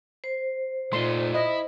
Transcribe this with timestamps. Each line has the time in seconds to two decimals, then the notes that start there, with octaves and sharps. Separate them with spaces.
0.24 C5
0.93 A#2 A3 D#4 C6
1.35 E4 D#5